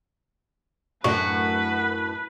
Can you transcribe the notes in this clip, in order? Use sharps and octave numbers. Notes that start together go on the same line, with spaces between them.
F#2 A2 D4 F#4 B4